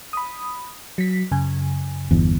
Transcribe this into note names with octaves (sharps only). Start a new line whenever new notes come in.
B5 D#6
F#3 B6
F#2 C#3 G#5
G1 E2